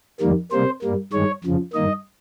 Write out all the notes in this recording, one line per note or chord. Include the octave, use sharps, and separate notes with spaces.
F2 D#3 G3 A#3
C3 G3 A#3 C5
G2 G3 A#3
G2 D#3 G#3 C#5
F2 C#3 F3
G2 D#3 A#3 D#5